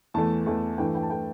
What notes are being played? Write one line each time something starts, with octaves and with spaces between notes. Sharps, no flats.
E2 E3 A3 A5
E2 E3 A3
G2 E3 A3 G5
G5
A5
E3 A3 G5